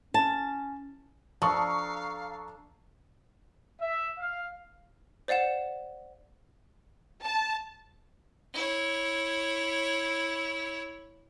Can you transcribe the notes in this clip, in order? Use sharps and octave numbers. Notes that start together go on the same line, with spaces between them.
C#4 A5
F3 D4 A4 F5 A#5 C#6 D#6
E5
F5
C5 D5 F5 F#5 E7
A5
E4 C#5